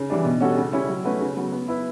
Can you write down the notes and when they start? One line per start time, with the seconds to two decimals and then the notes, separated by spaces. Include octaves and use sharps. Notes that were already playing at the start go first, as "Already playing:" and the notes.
Already playing: C#3
0.10 E3 G3 D4
0.25 B2
0.41 G3 C#4 F#4 A4
0.57 C#3
0.72 G3 C#4 E4
0.89 F#3
1.05 A3 C#4 F#4 B4
1.21 C#3
1.37 F#3 B3
1.52 B3
1.68 E4 B4 E5